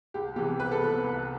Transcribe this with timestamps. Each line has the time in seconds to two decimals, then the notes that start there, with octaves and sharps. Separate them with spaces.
0.14 C2 G4
0.36 C3 E3 B3 G4
0.59 C2 B4
0.71 A4
0.81 C3 E3 B3 B4
1.04 C2